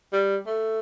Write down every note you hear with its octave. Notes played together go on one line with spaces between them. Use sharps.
G3
A3